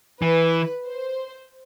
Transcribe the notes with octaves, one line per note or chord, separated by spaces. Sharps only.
E3 B4
C5